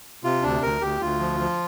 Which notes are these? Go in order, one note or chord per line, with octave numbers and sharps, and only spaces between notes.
C3 F4
D2 D4
D2 A#4
D2 G4
D2 F4
F3
F3